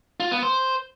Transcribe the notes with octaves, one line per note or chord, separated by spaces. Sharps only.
F4
B3
C5